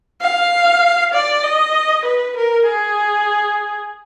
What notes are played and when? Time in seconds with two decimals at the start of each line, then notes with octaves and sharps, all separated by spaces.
0.21 F5
1.13 D5
1.43 D#5
2.05 B4
2.36 A#4
2.66 G#4